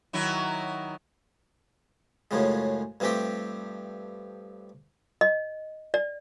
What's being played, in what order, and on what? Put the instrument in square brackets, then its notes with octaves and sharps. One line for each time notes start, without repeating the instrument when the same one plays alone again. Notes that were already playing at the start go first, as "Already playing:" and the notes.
[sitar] D#3 F#3 E4
[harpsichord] F#2 A2 C#3 F3 G#3
G2 F3 A3 C4 G4 G5
[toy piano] D#5
D5